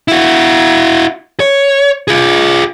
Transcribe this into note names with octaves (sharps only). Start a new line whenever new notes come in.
E4 F#4
C#5
F4 G#4